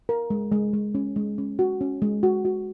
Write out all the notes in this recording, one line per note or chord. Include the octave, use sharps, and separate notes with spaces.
A#4
G#3
G#3
G#3
C#4
G#3
C#4
F#4
C#4
G#3
F#4
F#4